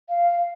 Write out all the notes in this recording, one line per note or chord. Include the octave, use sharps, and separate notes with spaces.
F5